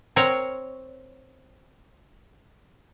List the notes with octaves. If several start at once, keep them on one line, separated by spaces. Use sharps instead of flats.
C4 A#4 C#5